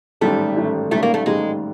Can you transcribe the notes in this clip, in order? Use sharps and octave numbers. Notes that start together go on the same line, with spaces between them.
A1 G#2 D#3 G3 A3
A1 G#2 D#3 G3
A1 G#2 D#3 G3 A3
A#3
A3
A1 G#2 D#3 G3 G#3